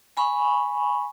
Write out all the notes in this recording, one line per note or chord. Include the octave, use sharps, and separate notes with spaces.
G#5 B5 C#6